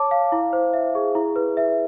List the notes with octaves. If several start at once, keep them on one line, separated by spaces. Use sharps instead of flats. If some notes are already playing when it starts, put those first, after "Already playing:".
Already playing: C#5 A5 D6
F5
E4
C5
E5
G#4
E4
B4
E5